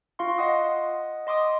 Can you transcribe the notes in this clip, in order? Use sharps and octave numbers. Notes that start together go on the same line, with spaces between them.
F4 F5 C6 C#6
D#5 F#5 D#6
D#5 C6 D6 D#6